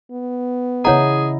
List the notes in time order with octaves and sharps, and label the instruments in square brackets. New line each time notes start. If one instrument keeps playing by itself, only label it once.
[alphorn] B3
[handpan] C#3 E4 D#5 [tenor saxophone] G#4 [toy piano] C#5 F#5 A#5